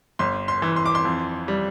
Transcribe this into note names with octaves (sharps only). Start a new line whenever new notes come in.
G1 C6
C6
E3
C6
D6
C6
F2
G3